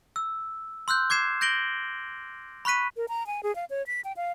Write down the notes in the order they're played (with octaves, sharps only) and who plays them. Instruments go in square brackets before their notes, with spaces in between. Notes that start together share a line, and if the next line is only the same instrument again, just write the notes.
[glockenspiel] E6
C6 E6 F#6 G6
D6 G#6 C7 E7
G6 A#6 D7 F#7 G7
B5 C#6 F#6 B6 D#7
[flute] A#4
A#5
G#5
G#4
F5
C#5
B6
G5
F5